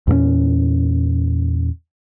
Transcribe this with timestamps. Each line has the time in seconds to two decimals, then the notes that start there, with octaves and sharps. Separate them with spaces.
0.07 E2 A#2 A3 C#4